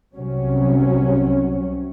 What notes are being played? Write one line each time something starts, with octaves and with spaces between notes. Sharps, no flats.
C2 C3 F#3 C#4